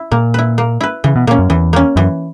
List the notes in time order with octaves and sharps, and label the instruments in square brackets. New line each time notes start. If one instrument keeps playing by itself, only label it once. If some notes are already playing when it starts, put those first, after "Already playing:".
Already playing: [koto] E4
[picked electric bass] A#2 [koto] A#3
[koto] E4 B4
A#3
E4 B4
[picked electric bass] C#3 [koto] E3
[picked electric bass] B2
[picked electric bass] A#2 [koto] A#3
[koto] C#4
[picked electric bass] F#2
[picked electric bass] E2 [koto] E3
[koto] A#3 C#4
[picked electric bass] F#2 [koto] E3